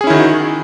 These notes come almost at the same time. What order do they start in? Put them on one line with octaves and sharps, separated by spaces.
G#4 C#4 E4 D#3 F#4